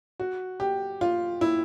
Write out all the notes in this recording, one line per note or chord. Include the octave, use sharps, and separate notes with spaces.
F#4
G4
F4
E4